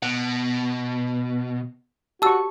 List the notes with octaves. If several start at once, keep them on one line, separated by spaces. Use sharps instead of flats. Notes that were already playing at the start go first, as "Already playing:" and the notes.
B2 F#5
F#4 G4 A5 C#6 E6